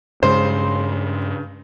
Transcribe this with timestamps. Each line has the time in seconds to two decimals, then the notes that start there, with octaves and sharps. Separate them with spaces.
0.23 G2 C#3 G#3 C#4 C5